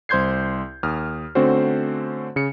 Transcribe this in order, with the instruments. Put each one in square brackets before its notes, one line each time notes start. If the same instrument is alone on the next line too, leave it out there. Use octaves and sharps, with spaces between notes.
[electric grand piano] C2 C5 C6 G6 G#6 C7
D#2 D#6 F6
D3 A3 C4 C#4 F#4 C5
C#3 C#7